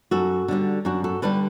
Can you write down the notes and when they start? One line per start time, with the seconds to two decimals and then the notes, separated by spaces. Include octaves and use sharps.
0.11 F#2 F#4 A4
0.48 D3 G3 D4
0.85 F#2 D4 F#4
1.04 F#4 A4
1.22 D3 G3 D4 G4 B4